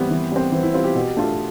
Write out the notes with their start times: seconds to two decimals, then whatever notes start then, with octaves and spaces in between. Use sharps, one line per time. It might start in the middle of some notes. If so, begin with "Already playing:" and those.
Already playing: E3 G3 B3 C4
0.10 E3
0.32 G3 C4
0.52 E3 C4
0.63 E4
0.74 G3 C4 F4
0.84 G4
0.95 B2
1.17 A3 D4 F4